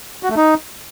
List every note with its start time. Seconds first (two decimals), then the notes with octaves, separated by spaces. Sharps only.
0.23 F#4
0.30 A3
0.36 D#4